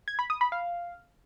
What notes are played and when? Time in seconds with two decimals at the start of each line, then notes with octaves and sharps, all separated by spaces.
0.08 G#6
0.19 B5
0.30 D#6
0.41 B5
0.52 F5